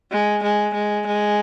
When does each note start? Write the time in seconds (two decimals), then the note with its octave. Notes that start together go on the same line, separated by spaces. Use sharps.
0.11 G#3
0.43 G#3
0.74 G#3
1.06 G#3